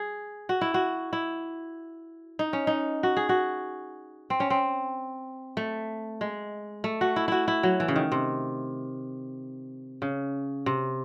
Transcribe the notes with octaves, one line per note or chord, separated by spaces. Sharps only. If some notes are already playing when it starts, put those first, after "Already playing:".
Already playing: G#4
F#4
E4
F#4
E4
D#4
C#4
D#4
F#4
G#4
F#4
C4
C#4
C4
A3
G#3
A3
F#4
E4
E4 F#4
E4
F#3
E3
C#3
D#3
C3
C#3
C3